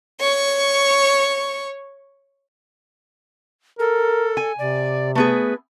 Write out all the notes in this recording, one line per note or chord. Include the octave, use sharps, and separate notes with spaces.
C#5 C#6
A4 A#4
G#5
C3 D5
A3 B3 G#4 B4